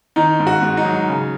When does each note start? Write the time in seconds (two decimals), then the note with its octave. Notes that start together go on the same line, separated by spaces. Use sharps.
0.16 D#3 D#4
0.39 G#2
0.47 F#4
0.62 G#2
0.77 D#4
0.85 F#3
1.08 C#3